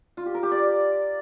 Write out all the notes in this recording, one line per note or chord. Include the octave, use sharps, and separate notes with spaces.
F4
G4
A#4
G4
D5